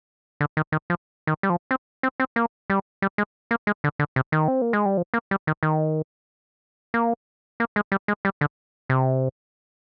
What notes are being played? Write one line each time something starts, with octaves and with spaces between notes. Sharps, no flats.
D3
D#3
D#3
F3
D#3
G3
F3
C4
C4
C4
A#3
G3
G3
G#3
A#3
G#3
D3
D3
C3
D#3
C4
A#3
G#3
G3
F3
A#3
G3
D#3
D#3
A#3
A#3
G#3
G3
G#3
G3
D3
C3